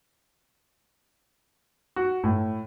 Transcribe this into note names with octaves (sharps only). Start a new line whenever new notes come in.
F#4
A2